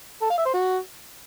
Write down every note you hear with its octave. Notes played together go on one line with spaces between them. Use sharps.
A4
F5
E5
C5
F#4